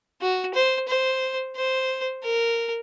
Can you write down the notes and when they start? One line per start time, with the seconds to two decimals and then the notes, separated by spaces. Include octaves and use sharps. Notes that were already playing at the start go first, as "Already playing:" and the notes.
0.21 F#4
0.54 C5
0.88 C5
1.56 C5
2.23 A#4